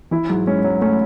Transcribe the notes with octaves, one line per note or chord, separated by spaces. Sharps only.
E3 E4
G#2 F#3
G#3 C#4
F#3
A3 C#4